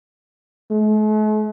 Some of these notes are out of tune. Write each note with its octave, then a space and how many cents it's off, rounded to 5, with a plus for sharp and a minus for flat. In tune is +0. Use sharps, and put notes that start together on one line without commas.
A3 -45